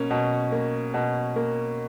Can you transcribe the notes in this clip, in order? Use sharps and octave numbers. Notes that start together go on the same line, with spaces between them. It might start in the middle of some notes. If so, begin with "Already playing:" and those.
Already playing: B2 A#3 C#4
B2
A#3
B2
A#3